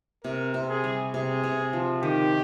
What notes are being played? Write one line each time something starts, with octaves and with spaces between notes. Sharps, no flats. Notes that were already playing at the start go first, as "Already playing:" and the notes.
C3 A#4
C3
G#4
G3
C3 G#4
C3
F3
D#3 G4